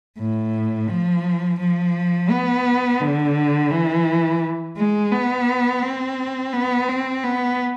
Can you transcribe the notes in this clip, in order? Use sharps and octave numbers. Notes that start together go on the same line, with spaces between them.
A2
F3
F3
B3
D3
E3
G#3
B3
C4
B3
C4
B3